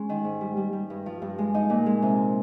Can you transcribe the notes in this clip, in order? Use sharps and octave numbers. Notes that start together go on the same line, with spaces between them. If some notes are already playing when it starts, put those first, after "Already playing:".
Already playing: G#3 C#4
D#3
G#2
G3
G3
G3
G2
F3
G2
G#3
F3 D#4
A#2
G#3
C3